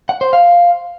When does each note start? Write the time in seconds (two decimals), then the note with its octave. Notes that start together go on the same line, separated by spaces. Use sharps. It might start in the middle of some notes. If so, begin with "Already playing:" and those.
0.09 F#5
0.21 C5
0.33 F5